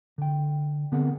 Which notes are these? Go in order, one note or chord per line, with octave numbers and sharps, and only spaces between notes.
D3 G5
D3 B3 C4 G#4 A#4 F#5